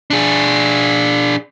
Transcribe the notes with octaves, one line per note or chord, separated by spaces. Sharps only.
D4 G#4